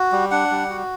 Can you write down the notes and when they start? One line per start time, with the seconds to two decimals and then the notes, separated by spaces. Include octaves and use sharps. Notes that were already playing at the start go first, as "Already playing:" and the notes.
Already playing: F#4
0.12 G3
0.31 D4 F#5
0.51 G3
0.69 F#4